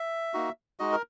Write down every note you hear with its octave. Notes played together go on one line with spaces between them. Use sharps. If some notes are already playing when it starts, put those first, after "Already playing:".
Already playing: E5
A#3 D#4 F#4
G#3 D#4 F#4 D#5
A#4